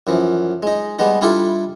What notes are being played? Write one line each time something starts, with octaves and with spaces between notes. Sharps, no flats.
F#2 E3 F3
G#3 D#4
G3 G#3 B3 D#4
G3 D4 E4 F4 G4 A4